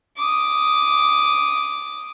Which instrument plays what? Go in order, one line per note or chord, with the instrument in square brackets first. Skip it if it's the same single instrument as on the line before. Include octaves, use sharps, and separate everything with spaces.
[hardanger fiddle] D6 D#6